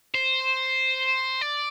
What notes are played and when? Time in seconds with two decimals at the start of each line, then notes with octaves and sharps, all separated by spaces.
0.14 C5
1.41 D5